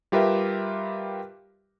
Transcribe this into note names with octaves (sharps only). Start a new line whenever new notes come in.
G3 F4 G4 A#4 B4 E5